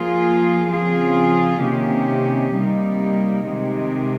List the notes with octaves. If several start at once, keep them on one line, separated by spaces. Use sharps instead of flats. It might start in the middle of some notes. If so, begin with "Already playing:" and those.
Already playing: F3 A#3 F4 G#4
C#3 F3 C4 F4 G#4
C3 D#3 A#3 C#4 G4
C3 G3 A#3 D#4
C3 D#3 G#3